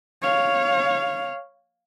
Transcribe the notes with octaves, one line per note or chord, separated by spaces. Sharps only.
C#5 F5